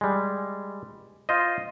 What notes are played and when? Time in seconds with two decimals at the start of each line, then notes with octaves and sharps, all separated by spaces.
0.01 G3 G#3
1.29 F4 C5 D#5